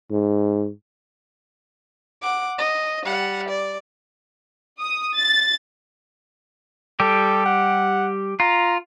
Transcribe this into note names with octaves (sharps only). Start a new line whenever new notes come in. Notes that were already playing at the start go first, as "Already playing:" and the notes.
G#2
F#5 D6
D#5
G3 F#5
D5
D#6
A6
G3 G4 A4
F#5
F4 A#5